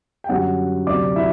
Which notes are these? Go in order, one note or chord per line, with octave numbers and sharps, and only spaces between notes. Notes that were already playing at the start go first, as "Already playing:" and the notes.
G5
F#2 D3 G3 F#4 F#5
D2 C3 F#3 D5 D6
E4 E5